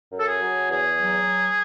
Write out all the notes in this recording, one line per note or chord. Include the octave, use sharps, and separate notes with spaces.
F#2
A4
G#4
F#3
E2 G#4
F#3